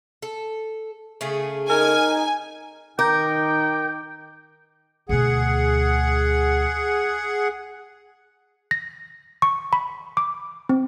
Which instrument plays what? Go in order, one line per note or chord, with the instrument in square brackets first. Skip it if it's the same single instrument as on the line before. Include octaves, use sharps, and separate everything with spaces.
[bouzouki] A4
C#3 A3 G#4
[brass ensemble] D#4 [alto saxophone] A#4 [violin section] G#5
[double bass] D#3 D#4 [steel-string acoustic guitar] A#4 [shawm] G5 [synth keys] D6 G6
[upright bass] D2 B2 [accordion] G#4 F#5
[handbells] A#6
C#6
B5
D6
C4